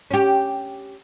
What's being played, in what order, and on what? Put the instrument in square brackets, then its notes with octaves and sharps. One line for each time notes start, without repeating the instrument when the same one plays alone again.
[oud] C#4 G4